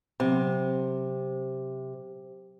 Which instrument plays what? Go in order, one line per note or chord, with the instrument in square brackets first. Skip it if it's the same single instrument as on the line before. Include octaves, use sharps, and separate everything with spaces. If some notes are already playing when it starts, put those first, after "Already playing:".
[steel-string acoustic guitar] C3 [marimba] F#3 C4